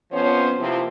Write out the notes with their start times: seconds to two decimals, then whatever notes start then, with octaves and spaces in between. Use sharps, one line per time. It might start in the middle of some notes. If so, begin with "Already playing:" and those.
0.12 F2 F3 B3 C#4 C5 C#5
0.58 C3 F3 A#3 C4 E4 F4